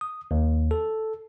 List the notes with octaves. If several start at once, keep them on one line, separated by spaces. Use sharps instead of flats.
D#6
D#2
A4